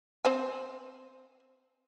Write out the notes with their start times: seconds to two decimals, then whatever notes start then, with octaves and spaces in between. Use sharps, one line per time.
0.25 C4 C5 G#5